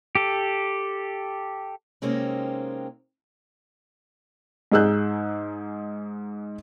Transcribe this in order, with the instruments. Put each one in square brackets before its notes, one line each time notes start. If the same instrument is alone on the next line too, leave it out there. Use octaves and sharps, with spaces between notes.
[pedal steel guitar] G4 A4
[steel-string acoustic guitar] C3 G#3 A#3 C4 C#4 D#4
[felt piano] G#2 D#4 G#4 E6 F#6 G6